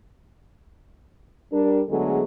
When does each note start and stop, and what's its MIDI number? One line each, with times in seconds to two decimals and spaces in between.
1.53 1.83 55
1.53 1.83 62
1.53 1.83 70
1.89 2.23 50
1.89 2.23 54
1.89 2.23 56
1.89 2.23 57
1.89 2.23 59
1.89 2.23 68